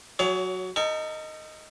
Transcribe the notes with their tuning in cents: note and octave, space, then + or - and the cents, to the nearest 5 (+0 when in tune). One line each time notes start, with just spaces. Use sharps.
F#3 +0 G#4 -25 C#5 +30
D#4 +0 A4 +40 G#5 +0